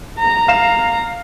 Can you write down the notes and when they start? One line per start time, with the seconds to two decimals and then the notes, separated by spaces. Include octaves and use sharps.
0.19 A#5
0.48 F5 E7